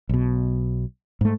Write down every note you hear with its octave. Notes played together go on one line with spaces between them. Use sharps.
B1 B2
G#2 A3